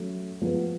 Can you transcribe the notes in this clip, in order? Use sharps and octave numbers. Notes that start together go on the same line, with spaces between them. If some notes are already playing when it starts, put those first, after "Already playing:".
Already playing: F#3 A3 C#4
F3 G#3 B3